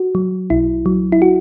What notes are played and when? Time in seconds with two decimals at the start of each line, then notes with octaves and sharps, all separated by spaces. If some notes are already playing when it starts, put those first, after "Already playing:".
Already playing: F#4
0.15 F#3
0.50 B1 E4
0.86 F#3
1.12 E4
1.22 F#4